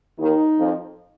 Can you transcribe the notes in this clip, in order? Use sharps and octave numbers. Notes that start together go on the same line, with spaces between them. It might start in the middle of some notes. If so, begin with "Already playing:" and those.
D#2 D#3 D#4
F2 F3